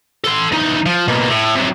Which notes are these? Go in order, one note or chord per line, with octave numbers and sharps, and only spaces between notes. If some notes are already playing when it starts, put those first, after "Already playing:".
A4 C6
E2 D#4
F3
B2 A#3
A2
C3 F#3